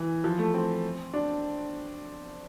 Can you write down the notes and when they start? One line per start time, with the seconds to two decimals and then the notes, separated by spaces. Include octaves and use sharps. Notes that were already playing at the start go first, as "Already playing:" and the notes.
Already playing: E3
0.24 F3
0.39 A3
0.54 C4
1.13 D4